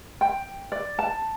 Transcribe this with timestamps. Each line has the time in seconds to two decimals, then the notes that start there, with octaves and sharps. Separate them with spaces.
0.21 G5
0.72 D5
0.99 A5